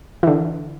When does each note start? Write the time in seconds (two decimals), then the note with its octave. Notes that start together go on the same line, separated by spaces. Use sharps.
0.23 E3
0.27 D3